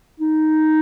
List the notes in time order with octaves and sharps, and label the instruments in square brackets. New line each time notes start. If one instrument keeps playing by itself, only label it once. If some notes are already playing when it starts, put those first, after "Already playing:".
[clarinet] D#4